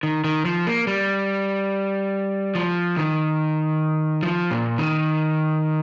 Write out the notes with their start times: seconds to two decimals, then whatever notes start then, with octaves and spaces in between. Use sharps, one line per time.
0.03 D#3
0.24 D#3
0.45 F3
0.67 A#3
0.87 G3
2.55 F3
2.97 D#3
4.23 F3
4.51 A#2
4.78 D#3